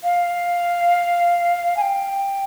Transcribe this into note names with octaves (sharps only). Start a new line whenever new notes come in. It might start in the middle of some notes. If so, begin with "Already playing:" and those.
F5
G#5
G5